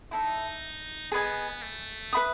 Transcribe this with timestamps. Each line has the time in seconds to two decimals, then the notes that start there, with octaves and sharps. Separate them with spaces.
0.11 D#4 E4 A4 E5
1.12 B3 G#4 B4 D#5 G#5
1.62 A3
2.13 B4 E5 B5 D#6